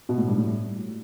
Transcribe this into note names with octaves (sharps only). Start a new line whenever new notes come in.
B2
A2
G2
A2